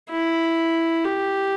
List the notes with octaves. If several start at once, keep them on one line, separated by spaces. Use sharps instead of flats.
E4
G4